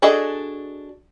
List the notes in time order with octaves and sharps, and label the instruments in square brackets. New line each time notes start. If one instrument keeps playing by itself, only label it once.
[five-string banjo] D4 F#4 G#4 A4 D#5